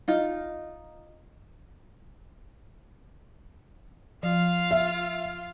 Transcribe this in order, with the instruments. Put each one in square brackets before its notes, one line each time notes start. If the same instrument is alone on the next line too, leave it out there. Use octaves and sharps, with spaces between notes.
[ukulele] D#4 F4
[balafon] F3 [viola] F4 F5
[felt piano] E5